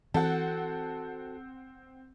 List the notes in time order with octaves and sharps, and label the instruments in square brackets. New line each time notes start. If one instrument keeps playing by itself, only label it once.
[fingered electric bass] E3 [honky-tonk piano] C4 F#5 [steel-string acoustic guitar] F#4 A4